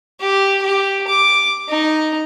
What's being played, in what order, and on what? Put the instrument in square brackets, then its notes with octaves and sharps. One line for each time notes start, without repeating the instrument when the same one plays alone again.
[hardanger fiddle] G4
G4
D6
D#4